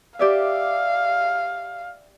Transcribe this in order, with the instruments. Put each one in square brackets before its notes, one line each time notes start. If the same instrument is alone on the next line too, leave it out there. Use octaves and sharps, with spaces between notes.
[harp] G4 D5 E5 [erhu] F5